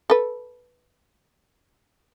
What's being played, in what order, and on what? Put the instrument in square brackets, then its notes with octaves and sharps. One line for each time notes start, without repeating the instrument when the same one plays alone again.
[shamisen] A4 B4